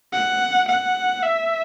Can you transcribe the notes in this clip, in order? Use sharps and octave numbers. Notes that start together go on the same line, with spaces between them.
F#5
F#5
E5